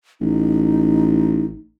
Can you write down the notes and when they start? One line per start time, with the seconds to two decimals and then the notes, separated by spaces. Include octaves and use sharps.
0.21 A1 D#4